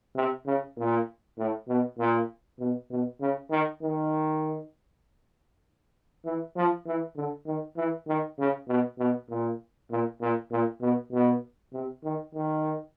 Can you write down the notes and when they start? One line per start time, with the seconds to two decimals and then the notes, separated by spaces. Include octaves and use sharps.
0.16 C3
0.46 C#3
0.77 A#2
1.38 A2
1.68 B2
1.99 A#2
2.59 B2
2.90 B2
3.21 C#3
3.50 D#3
3.82 D#3
6.25 E3
6.56 F3
6.86 E3
7.16 D3
7.46 D#3
7.76 E3
8.08 D#3
8.39 C#3
8.68 B2
8.99 B2
9.30 A#2
9.91 A#2
10.21 A#2
10.51 A#2
10.81 B2
11.12 B2
11.73 C3
12.04 D#3
12.34 D#3